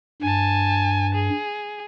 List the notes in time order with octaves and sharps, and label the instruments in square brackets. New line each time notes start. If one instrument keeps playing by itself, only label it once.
[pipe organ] G2 [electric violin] G#5 A5
[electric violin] G#4